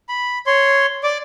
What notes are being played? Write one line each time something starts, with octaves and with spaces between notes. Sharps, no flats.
B5
C#5 C6
D5 D6